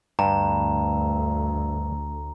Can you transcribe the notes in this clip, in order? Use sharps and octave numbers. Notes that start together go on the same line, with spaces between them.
D2 G2 A#5